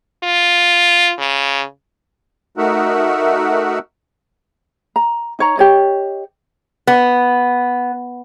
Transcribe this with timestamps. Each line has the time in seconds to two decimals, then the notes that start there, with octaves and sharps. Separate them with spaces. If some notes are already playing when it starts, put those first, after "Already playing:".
0.24 F4
1.19 C#3
2.57 A3 D#4 F#4 A#4 E5 F#5
4.96 A#5
5.39 D#4 C#5 A#5
5.57 G4 C#5 D#5
6.87 B3